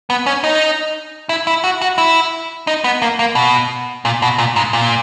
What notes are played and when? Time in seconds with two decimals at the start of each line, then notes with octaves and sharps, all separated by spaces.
0.10 B3
0.26 C#4
0.44 D#4
1.29 E4
1.47 E4
1.64 F#4
1.82 F#4
1.98 E4
2.67 D#4
2.84 B3
3.02 A#3
3.19 A#3
3.35 B2
4.05 A#2
4.22 B2
4.38 A#2
4.56 G#2
4.73 A#2